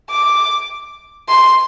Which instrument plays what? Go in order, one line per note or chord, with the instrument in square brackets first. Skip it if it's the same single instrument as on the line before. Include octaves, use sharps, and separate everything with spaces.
[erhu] D6
C6